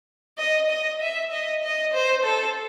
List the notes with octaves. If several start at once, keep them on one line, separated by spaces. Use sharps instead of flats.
D#5
D#5
E5
D#5
D#5
C5
A4